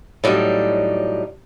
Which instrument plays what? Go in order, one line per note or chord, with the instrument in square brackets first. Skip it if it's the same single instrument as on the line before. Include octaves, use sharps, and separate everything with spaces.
[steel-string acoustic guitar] A2 F#3 G3 D4 D#4